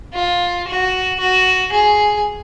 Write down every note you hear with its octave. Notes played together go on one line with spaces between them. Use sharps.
F4
F#4
F#4
G#4